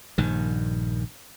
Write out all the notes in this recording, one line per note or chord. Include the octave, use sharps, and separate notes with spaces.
A#1 G2 D#3